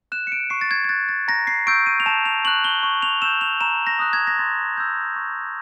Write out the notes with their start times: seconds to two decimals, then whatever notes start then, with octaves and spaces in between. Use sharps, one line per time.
0.12 F#6 E7
0.27 C#7
0.32 D7
0.50 C#6 C7
0.61 A6
0.71 G#6
0.84 G#6
0.89 F#6 A6
1.09 A6
1.28 A#5 A#6
1.47 C7
1.67 C#6 E6 G6 D7
1.86 D#7
2.00 F7
2.06 A5 E7
2.25 F7
2.45 C#6 F#6 F#7
2.64 G7
2.83 C#6
3.02 F7
3.22 E6 G6 E7
3.41 F7
3.61 A#5 E7
3.87 A#6
3.99 D#6 F#6
4.13 G#6
4.27 A#6
4.39 C6 A6
4.77 E6 G6
5.16 C#6